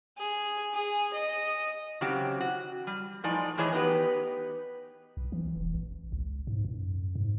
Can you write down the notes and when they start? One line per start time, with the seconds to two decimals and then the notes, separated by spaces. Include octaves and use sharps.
0.18 G#4
0.74 G#4
1.13 D#5
2.01 C#3 F#3 C4 G4
2.40 F#4
2.87 G3
3.24 A2 F3 D#4 D5 G#5
3.58 A2 E3 G#4 C#5 D#5
3.72 B3 D#4 E4 G4 B4
5.17 B1
5.32 E3
5.57 E1
5.74 A1
6.12 C#2
6.47 G#2
6.65 F#2
7.15 G#2